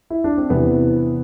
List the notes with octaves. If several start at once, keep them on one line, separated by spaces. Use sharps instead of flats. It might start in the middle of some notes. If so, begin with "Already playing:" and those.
E4
D4
C4
E2 C3 E3 B3